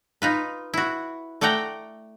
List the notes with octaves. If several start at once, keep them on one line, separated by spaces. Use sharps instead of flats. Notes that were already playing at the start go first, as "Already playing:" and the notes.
D#4 F4 B4
E4 F#4
A3 D5 F#5 G5 A#5